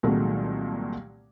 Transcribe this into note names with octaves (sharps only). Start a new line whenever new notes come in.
C2 A#2 D#3 F#3 G#3 A3